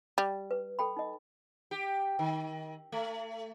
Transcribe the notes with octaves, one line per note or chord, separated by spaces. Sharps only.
G3
B4
A4 G5 B5
D#4 D#5
G4
D#3
A3